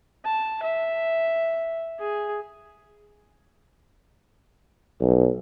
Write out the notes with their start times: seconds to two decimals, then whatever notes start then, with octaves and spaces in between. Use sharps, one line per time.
0.25 A5
0.63 E5
1.99 G#4
5.01 B1